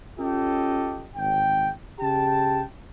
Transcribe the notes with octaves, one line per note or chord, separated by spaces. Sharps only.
C#4 F4 G4 A4 D#5
G#1 G5
C#3 G4 G5 A5